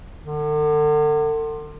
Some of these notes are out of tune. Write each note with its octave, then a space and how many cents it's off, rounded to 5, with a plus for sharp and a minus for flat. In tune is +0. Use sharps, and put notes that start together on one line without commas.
D3 +40